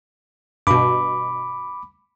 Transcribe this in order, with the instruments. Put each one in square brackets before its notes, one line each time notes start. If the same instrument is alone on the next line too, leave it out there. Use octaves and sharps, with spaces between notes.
[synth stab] G2 B2 [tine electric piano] B5 D6